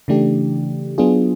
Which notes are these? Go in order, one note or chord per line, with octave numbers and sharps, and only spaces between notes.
C#3 E3 A3 D4 G4
F#3 B3 D4 F4 G#4